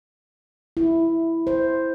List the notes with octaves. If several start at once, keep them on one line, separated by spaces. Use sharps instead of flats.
E4
C5